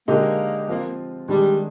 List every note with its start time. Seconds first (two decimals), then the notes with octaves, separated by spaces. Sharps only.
0.08 D3 G#3 A#3 D#4 G4
0.68 F3 A#3 C4 F4
1.28 D#3 G3 G#3 D4